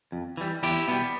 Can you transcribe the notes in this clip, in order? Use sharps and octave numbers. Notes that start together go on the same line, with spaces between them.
F2
E3 G3
E2 E4 G4
B2 G3 B3